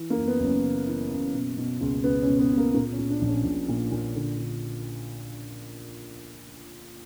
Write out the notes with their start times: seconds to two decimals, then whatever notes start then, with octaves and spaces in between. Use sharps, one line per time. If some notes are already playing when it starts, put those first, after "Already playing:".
Already playing: E3
0.10 A#3
0.16 F#2
0.28 B3
0.40 F#1
0.45 C#4
0.63 C#3
0.87 E3
1.10 F#2
1.34 B2
1.57 B2
1.80 C#2
2.04 C#2 B3
2.22 C#4
2.27 B2
2.39 B3
2.52 B2
2.57 A#3
2.74 A#2 A#3
2.92 C#4
2.98 A#2
3.10 D4
3.21 A#1
3.28 C#4
3.44 A#1
3.69 A#2
3.92 A#2
4.15 D3
4.38 D3